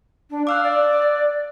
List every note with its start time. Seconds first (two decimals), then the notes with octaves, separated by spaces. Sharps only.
0.31 D4
0.47 F5 D6 E6 F#6
0.64 D5